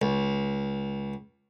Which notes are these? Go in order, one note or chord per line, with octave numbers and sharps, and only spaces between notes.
C#2